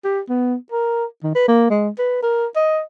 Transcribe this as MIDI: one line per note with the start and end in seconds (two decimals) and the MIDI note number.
0.04 0.20 67
0.29 0.55 59
0.72 1.05 70
1.24 1.32 51
1.35 1.46 71
1.48 1.70 58
1.71 1.89 56
1.99 2.21 71
2.23 2.46 70
2.56 2.80 75